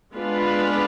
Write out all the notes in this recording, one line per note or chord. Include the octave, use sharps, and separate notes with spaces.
G#3 B3 D4 F4 B4